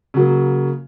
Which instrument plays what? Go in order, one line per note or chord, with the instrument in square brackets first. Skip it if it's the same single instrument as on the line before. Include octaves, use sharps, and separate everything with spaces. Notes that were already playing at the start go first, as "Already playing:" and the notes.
[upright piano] C#3 F#3 A#3